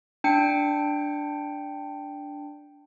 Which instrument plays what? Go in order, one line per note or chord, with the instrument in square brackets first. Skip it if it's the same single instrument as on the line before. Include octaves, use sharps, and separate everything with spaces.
[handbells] D4 G5 C#7